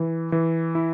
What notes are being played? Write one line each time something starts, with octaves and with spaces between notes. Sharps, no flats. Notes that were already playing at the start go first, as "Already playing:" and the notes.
Already playing: E3
E3
E4